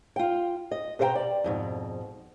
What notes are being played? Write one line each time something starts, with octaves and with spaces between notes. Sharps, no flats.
F4 G5
D#5
B2 A4 C5 E5 G5 A#5
D5
F2 G#2 B2